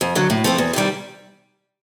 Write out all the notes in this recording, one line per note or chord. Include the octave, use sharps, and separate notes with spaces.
F2
D3 F#3
A2
F3 A3 C4
E2
C3 D#3 G3